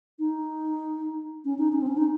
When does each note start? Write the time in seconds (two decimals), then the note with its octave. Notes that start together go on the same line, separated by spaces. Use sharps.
0.19 D#4
1.45 C#4
1.59 D#4
1.73 C#4
1.82 C4
1.87 C#4
1.97 D#4